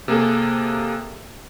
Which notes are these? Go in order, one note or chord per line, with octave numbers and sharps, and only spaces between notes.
C3 A#3 G#4 A4